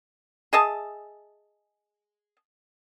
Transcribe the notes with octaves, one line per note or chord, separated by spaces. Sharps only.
G#4 D#5 E5 A5